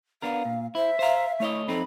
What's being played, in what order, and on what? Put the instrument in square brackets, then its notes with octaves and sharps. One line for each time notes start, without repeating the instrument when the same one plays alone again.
[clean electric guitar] B3 D4 A#4 [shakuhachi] F5
[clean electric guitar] A#2
[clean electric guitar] E4 [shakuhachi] C5 [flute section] E5
[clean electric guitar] C5 A#5 [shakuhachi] F5
[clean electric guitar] A3 C#5 D#5 [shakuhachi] E4
[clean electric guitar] F2 C4 D#4 [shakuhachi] A4 [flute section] B5